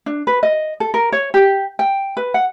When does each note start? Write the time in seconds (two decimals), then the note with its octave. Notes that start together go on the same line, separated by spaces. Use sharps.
0.06 D4
0.27 B4
0.43 D#5
0.80 A4
0.94 A#4
1.12 C#5
1.34 G4
1.79 G5
2.17 B4
2.34 F#5